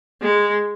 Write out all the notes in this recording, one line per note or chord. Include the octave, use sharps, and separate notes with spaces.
G#3